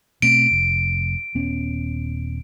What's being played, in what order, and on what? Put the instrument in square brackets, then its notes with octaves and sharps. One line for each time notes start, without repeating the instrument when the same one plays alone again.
[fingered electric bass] B2 A3 C4 [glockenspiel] D7
[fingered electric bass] F1
D#1 B3 C#4